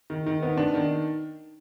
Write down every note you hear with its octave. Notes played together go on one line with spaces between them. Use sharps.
D#3
D#3
B3
D4
D#3